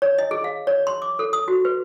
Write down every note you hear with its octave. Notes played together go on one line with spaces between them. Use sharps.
C#5
D#5
G#4
F5
C#5
C6
D6
A4
D#6
F#4
B4